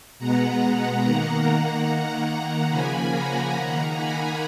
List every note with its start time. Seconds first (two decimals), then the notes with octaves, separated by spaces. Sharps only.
0.19 B2 G#3 B3 F#5 A#5
1.02 D#3 A#3 F#5 A#5
1.87 D#3 A#3
2.70 C#3 F3 A#3 G#5 B5
3.11 F#5 A#5
3.53 D#3 A#3 F#5 A#5
3.95 G#5 B5